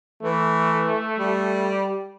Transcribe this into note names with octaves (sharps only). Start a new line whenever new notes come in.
E3 A3
G3